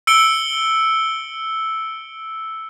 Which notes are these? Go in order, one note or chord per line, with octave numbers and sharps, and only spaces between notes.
E6 C#7 D7 G7